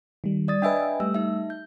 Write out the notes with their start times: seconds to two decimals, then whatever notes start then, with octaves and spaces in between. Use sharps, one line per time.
0.24 D#3 G3
0.48 D5 D#6 A6
0.62 D4 B4 D#5 E5 G5 G#5
1.00 G3 A3 E6
1.14 D#4 E5
1.50 G6